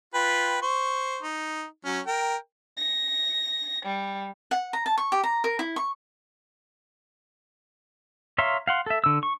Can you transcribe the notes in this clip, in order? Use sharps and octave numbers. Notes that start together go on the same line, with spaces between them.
F4 B4 G5
C5 C#6
D#4
F#3 C#4
A#4 G5
A#6
G3
F#5
A#5
A5
C#6
G4
A#5
A#4
E4
C#6
C#5 E5 F5 A#5 C6
F5 F#5 C6
A4 E5
D3 E6
C#6